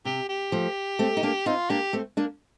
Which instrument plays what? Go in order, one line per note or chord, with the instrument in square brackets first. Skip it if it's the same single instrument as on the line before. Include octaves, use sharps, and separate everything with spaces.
[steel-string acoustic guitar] C3 [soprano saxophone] G4
[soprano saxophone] G4
[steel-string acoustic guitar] F3 A3
A3 C4
D#4
A#3 D4
[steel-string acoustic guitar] C4 D#4 [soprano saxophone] F4
[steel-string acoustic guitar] A#3 D4 [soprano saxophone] G4
[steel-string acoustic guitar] A3 C4
A#3 D4